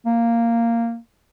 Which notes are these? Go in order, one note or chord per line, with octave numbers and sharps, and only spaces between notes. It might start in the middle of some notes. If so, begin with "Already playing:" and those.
A#3